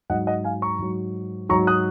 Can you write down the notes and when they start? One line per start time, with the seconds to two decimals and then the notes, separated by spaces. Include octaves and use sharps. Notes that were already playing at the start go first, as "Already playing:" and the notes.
0.10 G#2 F#3 D#5 F#5
0.27 D#5 F#5
0.44 F5 G#5
0.62 A#5 C#6
0.79 G#2 F#3
1.49 G#2 F#3 A#5 C#6
1.67 D#6 F#6